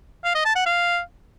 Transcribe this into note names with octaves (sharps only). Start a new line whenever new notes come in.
F5
D#5
A5
F#5
F5